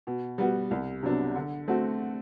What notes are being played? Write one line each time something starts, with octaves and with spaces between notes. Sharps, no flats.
B2
G3 B3 F#4
C2
C3 F#3 B3 D4
D3
A3 C4 F#4